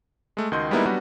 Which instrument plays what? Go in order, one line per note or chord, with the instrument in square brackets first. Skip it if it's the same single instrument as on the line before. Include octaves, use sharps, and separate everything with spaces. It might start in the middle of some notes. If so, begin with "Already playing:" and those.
[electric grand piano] G#3 A3
C#2 D#3 F#4 D#5 C6 G6
G3 G#3 A#3 B3 D#4 E4
F#3 G3 B3 D4 F#4